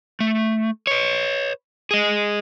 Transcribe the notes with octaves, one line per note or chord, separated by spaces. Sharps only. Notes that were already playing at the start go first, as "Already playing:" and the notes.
A3
B4 C#5
G#4 D#5